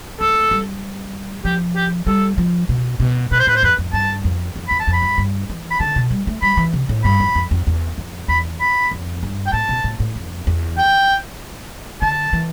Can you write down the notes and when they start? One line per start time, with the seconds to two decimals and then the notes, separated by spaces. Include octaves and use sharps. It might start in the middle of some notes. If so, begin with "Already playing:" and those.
0.20 A3 A4
0.51 G3
1.45 F3 G4
1.76 G4
2.07 G3 A4
2.38 F3
2.69 B2
3.00 B2
3.31 B2 B4
3.39 C5
3.47 A2 B4
3.56 C5
3.63 F2 B4
3.78 F2
3.93 G2 A5
4.24 F2
4.56 F2
4.68 E2 B5
4.80 A5
4.87 F2
4.93 B5
5.02 G2
5.18 G2
5.50 E3
5.71 B5
5.80 D3 A5
5.96 B2
6.11 G3
6.27 A3
6.42 G3 B5
6.57 E3
6.73 C3
6.89 A2
7.04 G2 B5
7.20 F2
7.35 F2
7.51 F2
7.67 E2
7.98 F2
8.28 E2 B5
8.60 B5
8.91 F2
9.23 G2
9.46 G5
9.53 A2 A5
9.69 B2
9.84 A2
10.00 A2
10.15 F2
10.47 E2
10.78 G5
12.02 D3 A5
12.33 E3